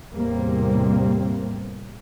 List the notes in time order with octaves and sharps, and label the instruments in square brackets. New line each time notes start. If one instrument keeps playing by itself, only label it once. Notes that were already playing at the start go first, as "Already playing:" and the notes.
[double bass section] E2 A2 C3 G3 A#3 C4